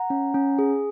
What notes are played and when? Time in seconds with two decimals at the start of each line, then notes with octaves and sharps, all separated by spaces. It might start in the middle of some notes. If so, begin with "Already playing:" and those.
Already playing: F#5 A#5
0.10 C#4
0.34 C#4
0.59 G#4